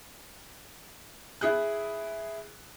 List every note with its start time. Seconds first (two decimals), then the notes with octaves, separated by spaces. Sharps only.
1.41 E4 G#4 F#6